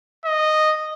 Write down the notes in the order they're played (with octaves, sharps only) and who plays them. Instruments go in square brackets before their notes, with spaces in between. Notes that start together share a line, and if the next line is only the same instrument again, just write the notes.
[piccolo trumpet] D#5